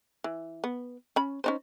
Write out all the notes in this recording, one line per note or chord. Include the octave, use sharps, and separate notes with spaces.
E3
B3
C#4 B5
C#4 D#4 C5